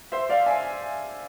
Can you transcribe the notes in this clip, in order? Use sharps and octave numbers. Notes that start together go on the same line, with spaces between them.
C5 E5
D5 F5
E5 G#5